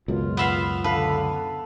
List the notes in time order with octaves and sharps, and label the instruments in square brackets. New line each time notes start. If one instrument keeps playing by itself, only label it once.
[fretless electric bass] C#2 F#2 B2 [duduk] F4
[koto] B3 E5 F5
[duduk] D3 [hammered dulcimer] A4 F5 [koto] B4